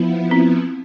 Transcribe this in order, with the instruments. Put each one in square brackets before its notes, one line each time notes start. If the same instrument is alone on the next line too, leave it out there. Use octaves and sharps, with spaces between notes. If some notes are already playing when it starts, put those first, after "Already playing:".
Already playing: [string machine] F3 B3 E4
[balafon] C4